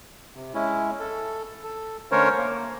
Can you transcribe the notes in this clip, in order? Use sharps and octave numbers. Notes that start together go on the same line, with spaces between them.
C3
G#3 C#4 E4
A4
A4
D3 A3 C#4 A#4 C5 C#5
A#3